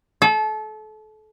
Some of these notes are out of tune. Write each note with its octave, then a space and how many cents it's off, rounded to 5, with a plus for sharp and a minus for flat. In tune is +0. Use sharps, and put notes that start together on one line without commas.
A4 -30